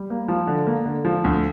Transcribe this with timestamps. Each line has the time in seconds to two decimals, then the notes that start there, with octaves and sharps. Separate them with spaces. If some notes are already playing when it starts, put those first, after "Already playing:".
Already playing: G3
0.10 A#3
0.28 F3
0.47 D3
0.67 A#3
0.86 D3
1.05 F3
1.24 D2